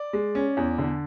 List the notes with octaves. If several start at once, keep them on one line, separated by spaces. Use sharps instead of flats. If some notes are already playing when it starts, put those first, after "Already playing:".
Already playing: D5
G#3
C#4
E2
D3